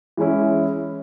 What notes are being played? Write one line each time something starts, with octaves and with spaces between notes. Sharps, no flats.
E3 G#3 C#4 E4